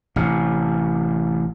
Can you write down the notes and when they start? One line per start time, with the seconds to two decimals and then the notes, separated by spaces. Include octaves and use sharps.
0.16 A1 C3